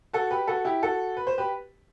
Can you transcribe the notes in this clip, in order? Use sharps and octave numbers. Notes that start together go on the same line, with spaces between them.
F#4 A4
G4 B4
F#4 A4
E4 G4
F#4 A4
B4
C5
G4 B4